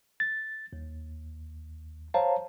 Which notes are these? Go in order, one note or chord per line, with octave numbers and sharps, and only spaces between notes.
A6
D#2
C5 C#5 F5 A5 A#5